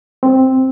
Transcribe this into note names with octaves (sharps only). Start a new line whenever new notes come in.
C4